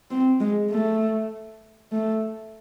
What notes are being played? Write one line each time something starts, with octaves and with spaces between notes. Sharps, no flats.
C4
G#3
A3
A3